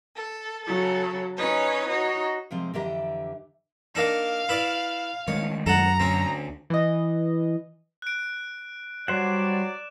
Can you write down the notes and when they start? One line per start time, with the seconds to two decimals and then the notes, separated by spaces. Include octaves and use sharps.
0.15 A4
0.65 C#3 F#3 A4
1.36 C#4 D#4 B4 C#5
1.87 D#4 F#4 C#5
2.51 C3 F3 G#3 C4
2.74 F2 D3 E3 G4 E5 A#5
3.95 A#3 D4 D#4 F5
4.49 E4 B4 D5
5.28 D#3 G#3 A3 C#5
5.66 F#2 A4 F#5 A#5
6.00 D2 C4 C#4
6.70 E3 D#5
8.02 F#6 D7
9.08 F#3 G3 C5 D5 F#5 E7